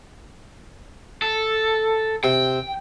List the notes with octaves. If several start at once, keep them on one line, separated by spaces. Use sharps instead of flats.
A4
C3 G5